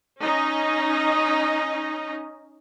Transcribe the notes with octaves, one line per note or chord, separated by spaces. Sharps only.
C#4 D#4 D#5 A#5